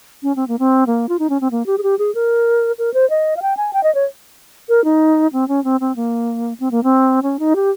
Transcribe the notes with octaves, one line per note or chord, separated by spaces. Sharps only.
C#4
C4
A#3
C4
A#3
F4
D#4
C#4
C4
A#3
G4
G#4
G4
G#4
A#4
A#4
C5
D#5
F5
G5
G#5
G5
D#5
C#5
A#4
D#4
C4
C#4
C4
C4
A#3
C4
A#3
C4
C#4
D#4
G4